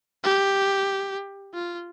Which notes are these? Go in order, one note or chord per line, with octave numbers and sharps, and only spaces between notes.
G4
F4